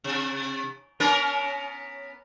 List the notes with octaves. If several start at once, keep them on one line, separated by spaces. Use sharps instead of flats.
C3
B3 C#4 A#4